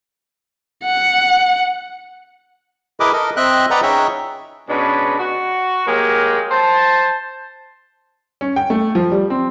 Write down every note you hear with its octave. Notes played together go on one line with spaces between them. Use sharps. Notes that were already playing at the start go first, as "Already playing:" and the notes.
F#5
E4 G#4 A#4 B4 D#5 D6
A4 A#4 D#5
C4 D#5 E5 G5 F#6
B4 D5 D#5 F#5 G5 A#5
C#4 D#4 G#4 C#5 E5 G5
B2 G#3 C#4 D4 B4
F#4
F#3 G#3 A#3 G4 A#4
C5 A5
C#4
G5
A3
F3
G3
C4